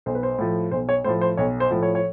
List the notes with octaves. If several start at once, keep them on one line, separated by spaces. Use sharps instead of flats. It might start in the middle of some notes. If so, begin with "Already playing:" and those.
B1 C5
B4
C5
A2 F3
B1 C5
C#5
A2 F3 C5
C5
B1 C#5
C5
A2 F3
C#5
C#5